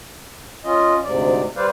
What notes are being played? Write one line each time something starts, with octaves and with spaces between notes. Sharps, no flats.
C#4 F4 D#5
D2 G#2 C3 D5
G3 B4 C5 D5 F5